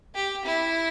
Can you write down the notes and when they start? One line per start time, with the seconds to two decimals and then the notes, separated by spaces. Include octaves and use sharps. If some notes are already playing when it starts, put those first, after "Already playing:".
0.15 G4
0.45 E4